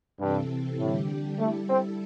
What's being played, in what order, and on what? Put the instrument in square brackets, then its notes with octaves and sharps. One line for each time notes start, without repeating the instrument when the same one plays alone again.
[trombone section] G2 [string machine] C3 E3 C4 A4
[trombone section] A2 [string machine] D3 G3 D4 G4
[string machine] G3 E4 A4 [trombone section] A3
[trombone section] C4